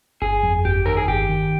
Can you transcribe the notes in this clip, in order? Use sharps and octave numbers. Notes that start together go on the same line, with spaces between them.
G1 G#4
F2
G1 G4
D#3 A#4
G#4
G1 G4
D#3